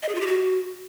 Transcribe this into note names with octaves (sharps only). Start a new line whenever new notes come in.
D#5
G#4
F4
G4
F#4